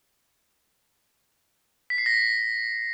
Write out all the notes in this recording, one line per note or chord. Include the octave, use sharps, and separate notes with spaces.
B6
C7
A#6
B6